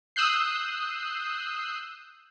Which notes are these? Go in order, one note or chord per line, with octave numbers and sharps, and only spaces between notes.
D#6 E6 F#6 G6 C7